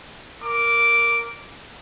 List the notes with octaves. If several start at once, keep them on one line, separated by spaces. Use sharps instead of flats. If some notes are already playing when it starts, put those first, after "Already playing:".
A#4 D6